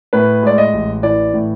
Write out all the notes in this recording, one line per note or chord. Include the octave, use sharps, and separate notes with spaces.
A2 B4
G#3 D5
D#5
A1
E3 D5
A2